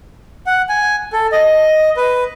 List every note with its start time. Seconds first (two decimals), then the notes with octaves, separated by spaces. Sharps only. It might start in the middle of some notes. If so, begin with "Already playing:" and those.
0.46 F#5
0.69 G#5
1.13 A4
1.32 D#5
1.97 B4